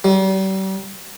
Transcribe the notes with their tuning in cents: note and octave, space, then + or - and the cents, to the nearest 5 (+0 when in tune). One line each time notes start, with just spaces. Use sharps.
G3 -40